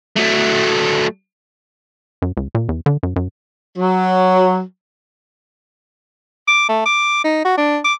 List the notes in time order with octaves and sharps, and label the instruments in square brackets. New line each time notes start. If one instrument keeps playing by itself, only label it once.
[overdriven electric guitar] F#3 A3
[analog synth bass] F#2
C#2
A#2
E2
D3
F#2
F#2
[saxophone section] F#3
[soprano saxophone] D6
A3
D6
D#4
F#4
D4
D6